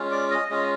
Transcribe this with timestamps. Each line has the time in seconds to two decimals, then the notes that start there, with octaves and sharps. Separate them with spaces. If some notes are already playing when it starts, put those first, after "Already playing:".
Already playing: G#3 C#4 F4
0.11 D5
0.31 D#5
0.50 G#3 C#4 F4 D#5